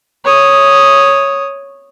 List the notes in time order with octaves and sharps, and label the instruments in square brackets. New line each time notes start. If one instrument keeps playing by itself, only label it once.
[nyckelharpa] C#5 D#6